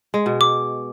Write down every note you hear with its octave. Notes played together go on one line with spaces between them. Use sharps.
G#3
B2
D6